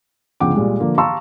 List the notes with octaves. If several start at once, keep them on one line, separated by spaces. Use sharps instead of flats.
G1 C#2 F3 F#5 G5 D6
A#2 G3 G#3
D3 F3 A#3
F5 A5 A#5 C6 C#6 E6